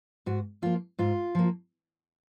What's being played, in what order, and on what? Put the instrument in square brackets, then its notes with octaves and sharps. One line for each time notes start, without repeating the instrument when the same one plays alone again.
[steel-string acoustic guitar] G#2 F#4
F3 A#3 F4
G#2 F4
F3 A#3